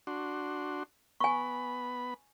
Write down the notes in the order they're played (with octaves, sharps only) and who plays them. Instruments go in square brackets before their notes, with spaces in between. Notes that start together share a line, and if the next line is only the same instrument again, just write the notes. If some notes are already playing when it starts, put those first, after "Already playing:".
[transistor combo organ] D4 F#4 C6
[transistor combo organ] B3 B5 [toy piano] G#5 C#6